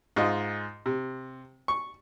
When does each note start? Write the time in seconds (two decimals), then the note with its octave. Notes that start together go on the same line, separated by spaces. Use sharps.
0.16 G#2 F4 D#5
0.86 C3
1.68 C#6